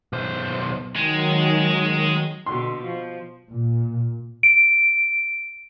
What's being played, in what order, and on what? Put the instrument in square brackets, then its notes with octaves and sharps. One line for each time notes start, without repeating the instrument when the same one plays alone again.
[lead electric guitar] B1 C5
[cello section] D#3 F#3 [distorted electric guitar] G#3
[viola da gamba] B2 D3 [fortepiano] C6
[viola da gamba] F3
[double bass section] A#2
[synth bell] D7